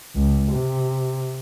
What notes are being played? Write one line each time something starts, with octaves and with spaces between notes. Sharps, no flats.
C#2
C3